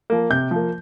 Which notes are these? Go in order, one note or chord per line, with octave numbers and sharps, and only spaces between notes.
F3 A#3
C3 G6
F3 A#3